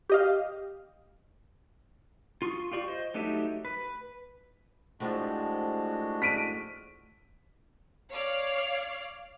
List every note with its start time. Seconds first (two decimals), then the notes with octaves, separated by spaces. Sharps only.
0.09 G4 D#5 F5
2.42 F4 C6 C#6 D#6
2.72 F4 G4 D5 C#6
2.88 C5 D#5
3.14 F#3 A3 D#4 G4 E5
3.65 B4
5.00 A2 F3 G#3 D4 F#4
6.22 B6 D7 D#7
8.12 C#5 D5 F5 F6 C7